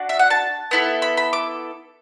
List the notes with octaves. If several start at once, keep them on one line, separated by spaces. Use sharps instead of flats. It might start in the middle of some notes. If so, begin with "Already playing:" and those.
Already playing: D4 F#4
E5
F#5
A5
B3 E4 A4
B5
B5
D6